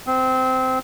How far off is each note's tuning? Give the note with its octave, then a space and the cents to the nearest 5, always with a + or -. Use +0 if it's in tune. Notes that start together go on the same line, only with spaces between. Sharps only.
C4 -20